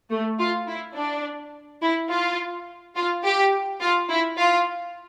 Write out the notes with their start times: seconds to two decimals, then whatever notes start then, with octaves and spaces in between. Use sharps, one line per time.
0.11 A3
0.39 F4
0.68 E4
0.96 D4
1.81 E4
2.10 F4
2.95 F4
3.24 G4
3.80 F4
4.09 E4
4.37 F4